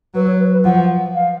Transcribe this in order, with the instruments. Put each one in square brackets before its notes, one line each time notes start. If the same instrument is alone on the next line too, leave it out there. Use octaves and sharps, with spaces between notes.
[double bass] F#3 [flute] B4
[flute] C#5
B4
B4
[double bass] F3 [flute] F#5
[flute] F5